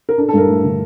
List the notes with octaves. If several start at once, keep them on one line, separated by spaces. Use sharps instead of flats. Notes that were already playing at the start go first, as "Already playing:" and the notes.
A#4
D4 A4
A4
G2 A#4
A3
D3